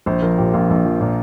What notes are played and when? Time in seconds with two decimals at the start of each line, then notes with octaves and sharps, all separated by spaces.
0.06 A#1 C5
0.22 F3 A#4
0.38 A#2 G4
0.54 A#1 F4
0.70 A#1
0.85 F3
1.01 A#2